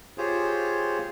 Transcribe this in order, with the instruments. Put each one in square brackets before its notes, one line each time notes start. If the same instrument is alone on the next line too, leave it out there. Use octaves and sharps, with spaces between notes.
[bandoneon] F4 G4 G#4 C5 C#5